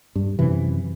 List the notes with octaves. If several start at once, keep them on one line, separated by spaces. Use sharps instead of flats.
G2
F#2 C3 E3